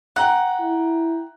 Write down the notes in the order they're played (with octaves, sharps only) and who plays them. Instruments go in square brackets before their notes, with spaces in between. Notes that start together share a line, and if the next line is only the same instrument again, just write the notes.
[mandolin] F#5 [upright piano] G5 A#5 F#6
[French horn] E4